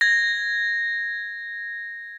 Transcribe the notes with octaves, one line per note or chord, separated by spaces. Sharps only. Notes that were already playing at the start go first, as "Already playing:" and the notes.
G#6 A#6